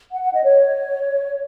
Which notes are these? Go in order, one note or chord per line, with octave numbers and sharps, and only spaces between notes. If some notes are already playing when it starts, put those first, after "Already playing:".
F#5
F#5
D#5
C#5